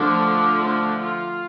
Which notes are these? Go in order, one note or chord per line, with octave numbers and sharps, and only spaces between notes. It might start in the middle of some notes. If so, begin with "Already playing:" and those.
Already playing: D3 F3 A3 D4
D4
F4